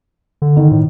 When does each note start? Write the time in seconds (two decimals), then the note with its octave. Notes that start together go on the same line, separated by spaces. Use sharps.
0.42 D3
0.57 D#3
0.71 A2